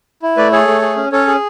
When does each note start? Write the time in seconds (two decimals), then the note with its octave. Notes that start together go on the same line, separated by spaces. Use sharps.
0.22 E4
0.37 A3 B4 D5
0.52 G#4 A4 C#5
0.68 A3
0.82 G#4
0.97 C#4
1.12 C#4 A4 C#5
1.28 G#4